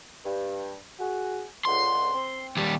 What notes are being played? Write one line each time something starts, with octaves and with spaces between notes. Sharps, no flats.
G2
F#4 G#4
C#2 D3 C6
C4
D#2 G3